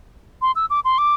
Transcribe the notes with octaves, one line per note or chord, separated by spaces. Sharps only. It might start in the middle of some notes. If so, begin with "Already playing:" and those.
C6
E6
D6
C6
D6